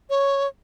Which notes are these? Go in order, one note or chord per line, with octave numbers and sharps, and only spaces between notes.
C#5